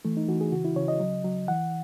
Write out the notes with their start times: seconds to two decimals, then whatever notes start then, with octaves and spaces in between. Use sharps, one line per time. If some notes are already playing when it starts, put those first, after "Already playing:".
0.05 E3 A3
0.17 D#4
0.29 E3 F#4
0.41 G#4
0.52 C#3 F#4
0.65 E4
0.76 C#3 C#5
0.88 D#5
1.00 F#3
1.24 F#3
1.48 E3 F#5